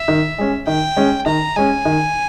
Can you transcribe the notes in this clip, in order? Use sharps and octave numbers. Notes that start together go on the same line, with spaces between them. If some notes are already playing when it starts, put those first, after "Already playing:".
Already playing: E5
D#3
G#3 C#4
D#3 G5
G#3 C#4
D#3 A#5
G#3 C#4 G#5
D#3